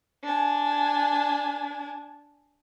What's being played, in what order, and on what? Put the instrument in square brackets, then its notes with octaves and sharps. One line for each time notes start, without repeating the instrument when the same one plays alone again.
[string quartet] D4 G#5